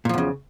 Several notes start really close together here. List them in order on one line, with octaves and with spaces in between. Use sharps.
A#2 F3 E2 C#3